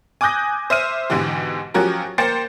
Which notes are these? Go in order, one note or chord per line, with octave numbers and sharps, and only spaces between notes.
G#5 D6 D#6 F#6 G6 A#6
C5 E5 F6 D#7
G#2 B2 D3 E3 G4
F3 F#3 C#4 F#4 G4 A#4
A#3 C5 G5 G6 A6 C#7